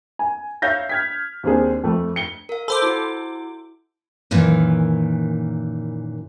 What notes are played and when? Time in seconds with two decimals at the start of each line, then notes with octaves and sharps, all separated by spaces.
0.19 G#5
0.62 C#5 E5 F5 G6 A#6
0.89 F6 G#6 B6
1.43 D#2 C4 D4 G#4
1.84 F2 A3
2.16 C#7 G7
2.49 A#4 F5
2.68 A4 C5 B5 D6
2.82 E4 F#4
4.31 F#2 A#2 D#3 E3